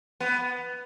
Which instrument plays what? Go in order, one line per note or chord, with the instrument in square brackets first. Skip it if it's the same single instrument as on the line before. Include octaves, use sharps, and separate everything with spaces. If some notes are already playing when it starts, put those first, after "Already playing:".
[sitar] B3